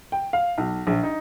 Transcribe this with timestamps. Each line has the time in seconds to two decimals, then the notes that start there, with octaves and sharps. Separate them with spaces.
0.12 G5
0.33 F5
0.58 B1
0.87 A#1
1.03 D#4